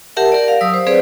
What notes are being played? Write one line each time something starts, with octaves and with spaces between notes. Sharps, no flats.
G4 A#4 E5 F#5 A5
A#4 D5
F5
F#3 D#6 E6
C5
C4 G#4 B4 C5 D5